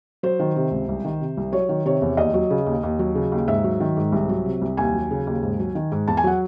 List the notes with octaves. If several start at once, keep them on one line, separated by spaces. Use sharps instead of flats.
F#3 C5
D#3
C3
C#2
C2
D#3
C3
C2
F#3 C#5
D#3
C3 C#5
E2
D#2 D#5
F#3
C#3
D#2
D#2
F#3
C#3
D#2
G#2 E5
F#3
D#3
G#2
C2
F#3
C3
C2
D#2 G#5
F#3
C#3
D#2
G#2
F#3
D#3
G#2
E2 A5
G#5
F#3 F#5